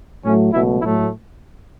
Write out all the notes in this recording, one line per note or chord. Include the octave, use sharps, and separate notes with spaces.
A2 F#3 A3 C#4
C#2 B2 F#3 A3 E4
A2 F#3 A3 E4